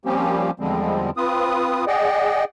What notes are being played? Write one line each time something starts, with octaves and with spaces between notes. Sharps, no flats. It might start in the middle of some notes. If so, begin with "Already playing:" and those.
F3 G3 A#3 C4 C#4 G4
E2 D3 F3 G3 G#3 C4
C4 F4 B4 D#6
G#4 D5 D#5 F#5 G5